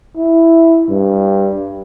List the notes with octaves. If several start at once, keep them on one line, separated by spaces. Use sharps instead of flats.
E4
G2